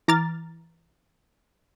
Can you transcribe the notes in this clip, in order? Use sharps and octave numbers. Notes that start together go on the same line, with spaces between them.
E3 A#5 D6 F6 A6